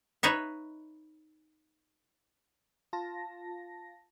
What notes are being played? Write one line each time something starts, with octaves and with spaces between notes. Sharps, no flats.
D#4 B4 C#5 E5
F4 A5 A#6